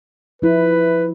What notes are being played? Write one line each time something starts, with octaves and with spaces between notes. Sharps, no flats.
F3 E4 B4